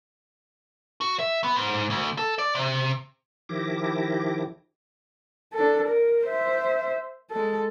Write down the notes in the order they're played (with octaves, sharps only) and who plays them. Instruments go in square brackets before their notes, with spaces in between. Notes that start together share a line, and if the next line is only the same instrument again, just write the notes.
[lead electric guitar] F#4
E5
B3
G#2
D2
A4
D5
C3
[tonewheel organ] D#3 F3 E4 G4 D6 A#6
[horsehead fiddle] D4 A4
A#4
C5 E5
G#3 A4